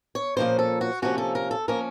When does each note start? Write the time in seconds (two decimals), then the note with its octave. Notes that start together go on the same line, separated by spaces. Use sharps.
0.15 C#5
0.37 A#2 F3 A#3 C#4 C5
0.59 A4
0.81 F#4
1.02 C3 F3 A#3 C#4 F#4
1.18 A4
1.35 A#4
1.51 A4
1.68 F3 A#3 C#4 A#4